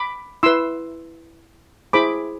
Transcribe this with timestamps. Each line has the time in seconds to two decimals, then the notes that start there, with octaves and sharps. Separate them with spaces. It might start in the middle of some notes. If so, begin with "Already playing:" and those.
Already playing: B5 D6
0.43 E4 B4 C6 E6
1.93 E4 G#4 C5 B5 D6